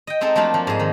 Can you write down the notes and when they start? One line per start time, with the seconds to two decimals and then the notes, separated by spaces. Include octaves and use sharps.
0.07 D#5 G5
0.21 G#3 C4 D#4 A4
0.36 F3 F#3 A3 A#3 D4 F4
0.54 F3
0.67 G#2 G#4
0.79 D#3